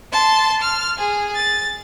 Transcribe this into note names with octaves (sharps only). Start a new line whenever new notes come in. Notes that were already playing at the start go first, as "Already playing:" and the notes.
A5 C6
F6
G#4
A6